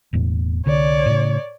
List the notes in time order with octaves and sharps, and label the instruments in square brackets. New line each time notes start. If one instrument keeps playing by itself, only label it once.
[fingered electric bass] E1 E2 A2
[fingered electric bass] C2 D3 [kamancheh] C#5 D5
[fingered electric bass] A2 C#3